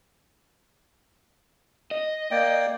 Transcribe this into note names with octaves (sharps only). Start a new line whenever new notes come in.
D#5
A#3 D5 G5